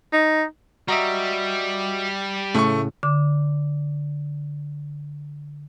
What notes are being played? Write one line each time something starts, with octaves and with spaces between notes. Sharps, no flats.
D#4
G3 F#4 D#5 E5 A#5
A2 C#3 A3 C#6
D3 D6